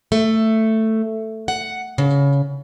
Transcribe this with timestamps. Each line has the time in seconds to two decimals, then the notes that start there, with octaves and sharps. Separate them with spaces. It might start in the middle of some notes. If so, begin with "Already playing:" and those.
0.12 A3
1.48 F#5
1.98 C#3